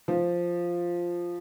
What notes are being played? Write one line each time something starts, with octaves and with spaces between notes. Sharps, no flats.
F3